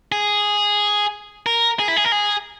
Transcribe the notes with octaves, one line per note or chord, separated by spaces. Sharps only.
G#4
A#4
G#4
E4
G#4
A#4
G#4